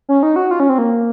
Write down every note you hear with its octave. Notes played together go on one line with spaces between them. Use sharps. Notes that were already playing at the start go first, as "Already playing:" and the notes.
C#4
D#4
F#4
F4
C#4
C4
A#3